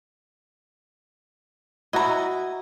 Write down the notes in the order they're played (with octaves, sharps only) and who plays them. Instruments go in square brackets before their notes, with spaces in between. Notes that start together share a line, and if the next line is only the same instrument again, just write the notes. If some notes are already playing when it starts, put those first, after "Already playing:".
[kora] E4 F#4 [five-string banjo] D#5 A#5